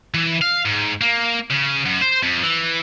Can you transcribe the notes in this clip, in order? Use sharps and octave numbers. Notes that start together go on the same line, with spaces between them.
E3
F5
G#2
A#3
C#3
F#2
C5
F2
E3